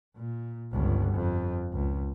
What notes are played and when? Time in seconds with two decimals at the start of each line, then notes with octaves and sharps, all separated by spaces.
0.16 A#2
0.73 G1 C#2
1.15 F2
1.74 C#2